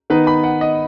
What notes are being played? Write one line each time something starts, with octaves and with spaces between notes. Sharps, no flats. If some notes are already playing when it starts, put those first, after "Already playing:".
D#3 B3 D#4 B4
B5
F#5
D#5